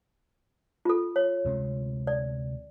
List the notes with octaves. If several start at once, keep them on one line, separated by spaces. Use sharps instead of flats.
F4 A4
C#5
D2 C3 G#3
D5